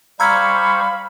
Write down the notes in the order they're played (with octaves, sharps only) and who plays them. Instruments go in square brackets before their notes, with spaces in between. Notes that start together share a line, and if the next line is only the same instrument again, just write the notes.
[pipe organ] G3 C5 C#6 [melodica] F5 [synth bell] A#5 E6 G#6 [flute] B5